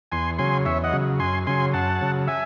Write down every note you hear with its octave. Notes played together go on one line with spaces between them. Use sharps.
E2 G#5 C6
C#3 F#3 G#5 C6
E2 C#5 E5
D#5 F#5
C#3 F#3
F#2 G#5 C6
C#3 F#3 G#5 C6
F#2 F#5 A5
C#3 F#3
E5 G#5